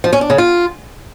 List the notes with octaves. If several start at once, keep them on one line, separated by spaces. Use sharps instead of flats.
F3
C#4
D4
C#3
F4